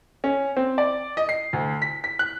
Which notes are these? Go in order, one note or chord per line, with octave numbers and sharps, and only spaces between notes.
C#4
C4
D5
D#5
C7
D2
B6
B6
F#6